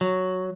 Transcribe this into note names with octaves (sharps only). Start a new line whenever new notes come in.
F#3